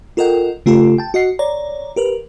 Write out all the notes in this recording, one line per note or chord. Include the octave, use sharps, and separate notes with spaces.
F4 A4 A#4 D#5 F#5 G5
C#3 A3 F4 G4 A4
G5 A5
F#4 D#5 F#5 C7
C#5 D5 A#5
G4 A#4 B4